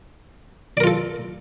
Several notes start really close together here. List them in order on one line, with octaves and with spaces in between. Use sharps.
D5 A#4 F4 A4